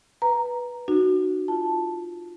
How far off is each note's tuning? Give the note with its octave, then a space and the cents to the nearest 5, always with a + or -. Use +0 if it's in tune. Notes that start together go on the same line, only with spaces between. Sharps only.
B4 -10 A#5 +0
D#4 -45 F#4 +0
F4 +0 A5 +0